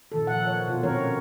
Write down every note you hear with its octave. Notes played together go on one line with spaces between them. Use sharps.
A#2 D#3 A4
F3 F#5
C#5
B2 F4
D#3 A#3 C4 C#4 A#4 C#5